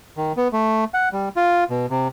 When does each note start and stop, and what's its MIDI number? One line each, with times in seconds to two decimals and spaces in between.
0.17 0.33 51
0.37 0.48 59
0.53 0.84 57
0.94 1.09 78
1.13 1.29 55
1.36 1.64 65
1.70 1.86 47
1.90 2.08 48